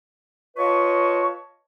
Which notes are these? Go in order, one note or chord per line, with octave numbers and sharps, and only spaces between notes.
F4 B4 C#5 D#5 A5 C#6